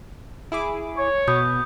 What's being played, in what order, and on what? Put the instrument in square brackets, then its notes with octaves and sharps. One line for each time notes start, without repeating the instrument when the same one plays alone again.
[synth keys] E4 G#4 D6
[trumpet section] C#5
[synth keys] B2 [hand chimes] B5 D#6 G6